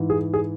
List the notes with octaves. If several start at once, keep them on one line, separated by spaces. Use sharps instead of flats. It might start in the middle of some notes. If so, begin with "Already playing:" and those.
Already playing: G#2 E3
G#4
G#4